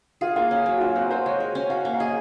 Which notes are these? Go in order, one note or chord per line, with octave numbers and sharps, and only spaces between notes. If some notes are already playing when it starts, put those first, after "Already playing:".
F4 G#4
A#3 F4
C#4
F#3
F#4
F4 A#4
C4 F#4
F#4 C5
G#3 C#5
A#4
C#4
F#4 F5
A#3
F5
G#4 D#5